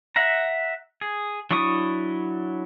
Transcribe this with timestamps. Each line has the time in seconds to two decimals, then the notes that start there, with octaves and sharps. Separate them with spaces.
0.16 E5 F#5 A#5
1.01 G#4
1.51 F#3 D4 E4 C#6 D#6